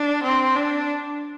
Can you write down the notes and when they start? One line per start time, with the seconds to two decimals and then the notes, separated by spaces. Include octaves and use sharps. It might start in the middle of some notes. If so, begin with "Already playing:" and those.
Already playing: D4
0.23 C4
0.55 D4